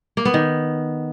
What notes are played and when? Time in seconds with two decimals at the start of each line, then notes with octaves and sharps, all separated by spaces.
0.17 A#3
0.25 B3
0.34 D#3